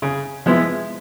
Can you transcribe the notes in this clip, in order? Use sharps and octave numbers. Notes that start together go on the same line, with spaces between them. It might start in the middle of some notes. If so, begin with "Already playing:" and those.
C#3
F3 G#3 B3 E4